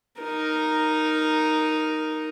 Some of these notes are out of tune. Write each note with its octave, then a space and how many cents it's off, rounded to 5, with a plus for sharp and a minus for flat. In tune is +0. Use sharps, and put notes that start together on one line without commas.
D#4 +0 A#4 +0